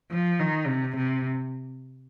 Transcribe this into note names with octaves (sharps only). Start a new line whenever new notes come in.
F3
D#3
C3
C3